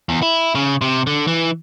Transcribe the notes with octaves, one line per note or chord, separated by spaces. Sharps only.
E2
E4
C#3
C3
D3
E3